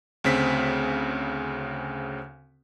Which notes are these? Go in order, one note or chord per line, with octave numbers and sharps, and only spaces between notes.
D2 C#3 C4 B6